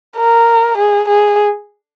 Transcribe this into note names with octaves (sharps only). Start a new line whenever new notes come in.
A#4
G#4
G#4